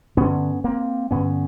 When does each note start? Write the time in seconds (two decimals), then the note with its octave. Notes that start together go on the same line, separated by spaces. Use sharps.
0.17 G2 D3 B3 C#4
0.64 A#3 C4
1.11 G2 D3 B3 C#4